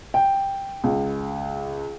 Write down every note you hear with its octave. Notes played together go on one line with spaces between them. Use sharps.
G5
C#2